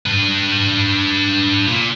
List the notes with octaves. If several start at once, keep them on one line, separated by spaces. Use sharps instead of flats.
D4 B4
A#2